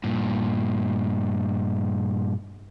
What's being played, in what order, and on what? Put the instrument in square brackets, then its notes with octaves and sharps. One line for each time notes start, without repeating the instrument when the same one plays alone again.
[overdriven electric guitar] G2 A#2